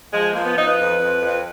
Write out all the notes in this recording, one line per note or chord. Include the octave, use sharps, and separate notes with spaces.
F3 G#3
F3 A#3
B3
F3 D#4
B4
F2
F2
F2